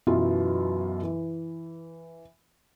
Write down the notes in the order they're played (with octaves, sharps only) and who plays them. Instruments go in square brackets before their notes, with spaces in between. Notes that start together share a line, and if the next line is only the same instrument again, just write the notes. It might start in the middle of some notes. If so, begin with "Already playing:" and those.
[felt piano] F#2 B2 E3 F#3 E4 F4
E3